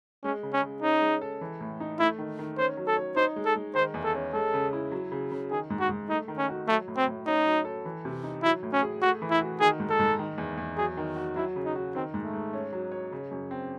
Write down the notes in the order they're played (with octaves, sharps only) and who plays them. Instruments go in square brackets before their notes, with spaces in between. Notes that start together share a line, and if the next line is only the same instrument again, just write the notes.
[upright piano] G#3 [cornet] C#4
[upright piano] C#3
[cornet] C#4
[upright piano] C#3
[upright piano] C#4 [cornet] D#4
[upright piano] G#3
A4
E3
A2
D#4
[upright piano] A3 [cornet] E4
[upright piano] D#3
D#3
[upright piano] C#4 [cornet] C5
[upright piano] F#3
[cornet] A4
[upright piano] C#5
[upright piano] D#4 [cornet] C5
[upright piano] G#3
[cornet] A4
[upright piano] G#3
[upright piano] D#3 [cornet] C5
[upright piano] E2
[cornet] A4
[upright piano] C#4
[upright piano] G#3 [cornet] A4
[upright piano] C#3
E4
F#3
C#3
C#3
[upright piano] D#3 [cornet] G#4
[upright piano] G#2
[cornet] F#4
[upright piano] G#2
[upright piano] A3 [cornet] D#4
[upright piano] D#3
[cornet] C#4
[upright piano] F#4
[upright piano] F#3 [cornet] A3
[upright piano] A2
[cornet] C4
[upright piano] A2
[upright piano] C#4 [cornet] D#4
[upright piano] F#3
A4
E3
C3
D#4
[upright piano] F#3 [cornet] E4
[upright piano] A2
[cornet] C#4
[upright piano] G#4
[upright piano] A3 [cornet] F#4
[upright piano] E3
[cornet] E4
[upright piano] F#4
[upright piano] D#3 [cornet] G#4
[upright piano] G#2
[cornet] A4
[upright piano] G#2
D#3
E2
E2
[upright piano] F#3 [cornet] G#4
[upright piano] D#3
F#4
[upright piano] F#3 [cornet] E4
[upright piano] C#3
[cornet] D#4
[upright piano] F#4
[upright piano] D#3 [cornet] C4
[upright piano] G#2
[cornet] A3
[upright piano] G#2
C#4
F#3
C#5
C#3
F#2
C4